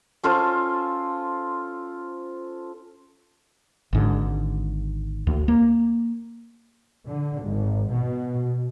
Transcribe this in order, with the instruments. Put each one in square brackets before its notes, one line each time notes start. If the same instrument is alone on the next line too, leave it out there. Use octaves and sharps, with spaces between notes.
[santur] C#4 F4 A4 C5
[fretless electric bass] G#1 G#2 D3
D2
A#3
[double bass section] D3
G#1
B2